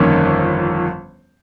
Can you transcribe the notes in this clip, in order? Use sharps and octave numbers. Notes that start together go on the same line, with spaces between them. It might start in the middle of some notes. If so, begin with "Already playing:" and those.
Already playing: G1 F2 D#3 A#3 C#4